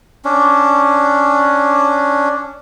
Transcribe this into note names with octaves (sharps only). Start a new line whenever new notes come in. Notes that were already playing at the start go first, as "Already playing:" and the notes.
C#4 D4